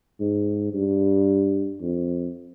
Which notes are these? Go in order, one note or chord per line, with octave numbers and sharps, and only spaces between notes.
G#2
G2
F2